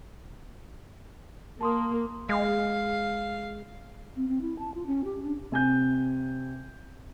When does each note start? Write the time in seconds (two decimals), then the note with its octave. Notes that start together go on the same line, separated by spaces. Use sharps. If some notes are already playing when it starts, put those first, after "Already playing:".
1.61 A#3 A5 C6 D#6
2.29 G#3 F5
4.16 C4
4.28 C4
4.41 E4
4.59 A5
4.74 F4
4.86 C#4
5.04 G4
5.23 D4
5.52 C3 G#5 G6